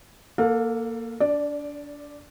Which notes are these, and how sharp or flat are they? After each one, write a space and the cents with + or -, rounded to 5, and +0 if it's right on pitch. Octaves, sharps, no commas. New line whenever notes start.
A#3 +0 A4 +25 F5 +30
D4 -25 D5 +0